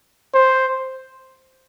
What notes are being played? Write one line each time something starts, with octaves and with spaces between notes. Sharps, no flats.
C5